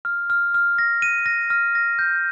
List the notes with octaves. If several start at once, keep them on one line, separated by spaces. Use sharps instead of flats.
F6
F6
F6
A#6
D#7
A#6
F6
A#6
G6